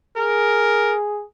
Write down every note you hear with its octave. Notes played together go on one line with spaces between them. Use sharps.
G#4 A#4